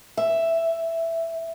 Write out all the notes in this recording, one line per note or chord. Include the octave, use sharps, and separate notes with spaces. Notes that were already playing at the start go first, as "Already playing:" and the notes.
E5